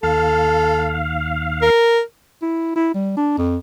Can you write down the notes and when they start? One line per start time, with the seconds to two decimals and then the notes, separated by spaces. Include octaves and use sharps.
0.03 D#2 A4 F5
1.62 A#4
2.42 E4
2.76 E4
2.94 G3
3.17 D4
3.37 F2